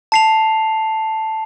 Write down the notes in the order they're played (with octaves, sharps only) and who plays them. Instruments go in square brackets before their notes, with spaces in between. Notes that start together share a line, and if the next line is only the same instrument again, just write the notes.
[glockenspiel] A5 C7 F7